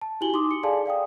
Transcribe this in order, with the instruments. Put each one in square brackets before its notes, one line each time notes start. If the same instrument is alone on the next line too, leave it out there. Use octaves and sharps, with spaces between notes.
[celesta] A5
E4 F#4 G4 G#5 F#7 G7
D#4 C6 D6 D#6
C#7
G#4 A4 D5 F5 G#5 A5
D5 F5 G5 D#6